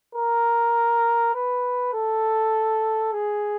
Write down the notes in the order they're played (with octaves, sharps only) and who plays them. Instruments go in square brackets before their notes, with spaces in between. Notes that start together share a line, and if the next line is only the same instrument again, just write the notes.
[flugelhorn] A#4
B4
A4
G#4